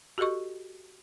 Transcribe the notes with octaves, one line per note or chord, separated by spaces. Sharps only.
F#4 G4 A4 D#5 C#6